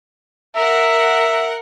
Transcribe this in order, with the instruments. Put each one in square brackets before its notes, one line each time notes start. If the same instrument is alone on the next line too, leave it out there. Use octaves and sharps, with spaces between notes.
[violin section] A#4 F#5 [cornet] E5